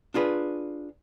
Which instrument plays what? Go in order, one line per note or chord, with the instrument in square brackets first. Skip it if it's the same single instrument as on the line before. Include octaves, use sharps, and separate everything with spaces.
[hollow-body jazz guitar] D4 F4 G#4 B4